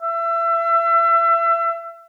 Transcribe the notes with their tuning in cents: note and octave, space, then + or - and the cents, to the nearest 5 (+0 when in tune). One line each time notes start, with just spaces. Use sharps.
E5 +30